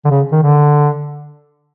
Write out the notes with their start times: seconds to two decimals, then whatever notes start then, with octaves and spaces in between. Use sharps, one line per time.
0.05 D3
0.11 C#3
0.32 D#3
0.42 D3